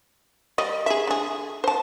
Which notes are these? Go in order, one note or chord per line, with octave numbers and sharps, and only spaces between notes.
G3 D#5
G#4 E5
D3 G#4
C5 A5